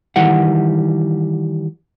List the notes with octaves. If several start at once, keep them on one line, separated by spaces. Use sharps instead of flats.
D#3 E3 G3 F#5